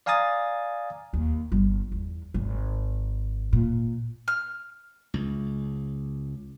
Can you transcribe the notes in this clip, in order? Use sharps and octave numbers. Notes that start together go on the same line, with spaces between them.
D5 F5 G#5 A#5 D#6 A6
D#2
G1 G3
E2
G#1
A#2
F6
C#2